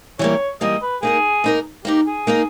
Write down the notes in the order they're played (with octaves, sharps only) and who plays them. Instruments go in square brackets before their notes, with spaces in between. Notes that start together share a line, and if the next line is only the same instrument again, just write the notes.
[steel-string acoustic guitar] E3 G3 A#3 [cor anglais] C#5
[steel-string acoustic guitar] E3 G3 A#3 [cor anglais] D#5
[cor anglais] B4
[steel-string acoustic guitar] A#3 D#4 A#4 [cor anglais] G#4
[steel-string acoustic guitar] A#3 D#4 A#4
[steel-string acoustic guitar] A#3 D#4 A#4 [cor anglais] G4
[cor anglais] G#4
[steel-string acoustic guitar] A#3 D#4 A#4